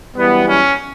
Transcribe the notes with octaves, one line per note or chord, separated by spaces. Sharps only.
F#2 E3 G3 B3
C#4